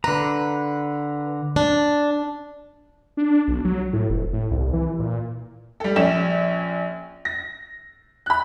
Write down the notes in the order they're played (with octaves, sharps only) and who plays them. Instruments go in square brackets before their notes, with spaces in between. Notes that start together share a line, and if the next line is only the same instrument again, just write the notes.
[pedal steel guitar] D3 A#5 [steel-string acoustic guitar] B4
[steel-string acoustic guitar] D4
[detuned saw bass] D4
B1
F#3
A2
F1
A2
C2
E3
A#2
[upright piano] G3 A4
A#1 C#4 G5 E7
A#6
B5 F#6